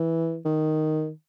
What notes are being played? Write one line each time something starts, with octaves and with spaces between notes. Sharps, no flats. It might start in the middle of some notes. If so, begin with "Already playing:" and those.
Already playing: E3
D#3